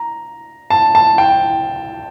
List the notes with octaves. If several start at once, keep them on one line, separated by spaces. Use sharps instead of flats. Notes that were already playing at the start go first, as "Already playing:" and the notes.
Already playing: A#5
A5
A5
G5